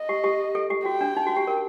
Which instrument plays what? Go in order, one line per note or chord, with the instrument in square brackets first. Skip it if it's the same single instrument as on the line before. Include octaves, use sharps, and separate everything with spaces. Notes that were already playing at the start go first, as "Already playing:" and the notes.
Already playing: [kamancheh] D#5
[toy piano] G4
G4
A4
G4
[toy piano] F#4 [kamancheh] G5
[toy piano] D4
D#4
F#4
G4
A#4